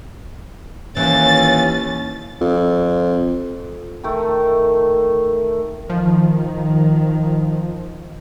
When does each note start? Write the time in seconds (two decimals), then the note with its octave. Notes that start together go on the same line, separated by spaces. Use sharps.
0.97 D#2 E3 C#4 A6
2.41 F2
4.04 D#3 A3
5.90 D#3 F3